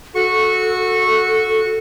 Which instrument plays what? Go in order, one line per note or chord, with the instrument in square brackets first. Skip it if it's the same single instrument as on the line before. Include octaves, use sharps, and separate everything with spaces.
[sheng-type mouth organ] F#4 C#6 [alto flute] A4